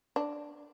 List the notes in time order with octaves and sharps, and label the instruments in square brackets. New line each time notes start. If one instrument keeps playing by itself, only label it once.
[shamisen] D4